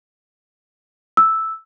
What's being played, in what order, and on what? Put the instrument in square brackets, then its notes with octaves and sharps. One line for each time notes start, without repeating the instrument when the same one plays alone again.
[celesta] E6